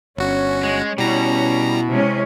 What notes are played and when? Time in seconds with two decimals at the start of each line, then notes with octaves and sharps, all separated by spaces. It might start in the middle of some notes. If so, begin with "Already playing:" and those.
0.17 G1 C#4 F#4 C#5
0.63 G#3
0.98 B2 G3 C#4 E4 A#5
1.89 C3 G#3 C#4